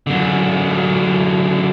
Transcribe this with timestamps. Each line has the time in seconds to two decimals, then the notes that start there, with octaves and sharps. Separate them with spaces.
0.07 F#2 D3